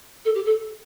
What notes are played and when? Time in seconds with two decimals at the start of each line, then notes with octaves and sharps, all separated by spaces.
0.25 A4
0.34 G4
0.45 A4